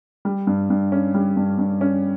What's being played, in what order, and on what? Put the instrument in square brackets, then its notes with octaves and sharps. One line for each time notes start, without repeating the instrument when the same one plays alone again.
[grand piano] G3
G2
G2
C#4
G3
G2
G2
C#4